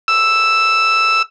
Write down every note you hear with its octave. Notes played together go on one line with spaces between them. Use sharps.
E6